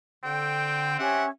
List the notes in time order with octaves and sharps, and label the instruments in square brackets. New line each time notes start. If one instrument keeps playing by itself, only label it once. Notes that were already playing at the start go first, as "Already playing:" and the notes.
[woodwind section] D3 [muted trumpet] C4 [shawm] G5
[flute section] C#4 [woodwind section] G4 E5 [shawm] F#5